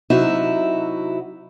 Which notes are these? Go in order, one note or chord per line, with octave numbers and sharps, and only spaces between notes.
C3 F#3 D#4 E4 F#4 E5